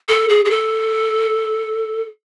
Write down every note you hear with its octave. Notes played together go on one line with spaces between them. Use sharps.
A4
G#4
G#4
A4